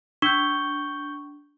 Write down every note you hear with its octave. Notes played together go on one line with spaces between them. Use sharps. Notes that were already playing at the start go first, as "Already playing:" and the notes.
D4 C#6 G6 G7